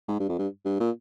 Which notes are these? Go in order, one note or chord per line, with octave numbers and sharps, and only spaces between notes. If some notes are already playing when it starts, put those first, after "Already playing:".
G#2
G2
F2
G2
G2
A#2